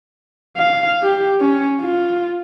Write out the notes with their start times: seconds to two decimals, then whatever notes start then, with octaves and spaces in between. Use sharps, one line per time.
0.57 F5
1.03 G4
1.40 C#4
1.81 F4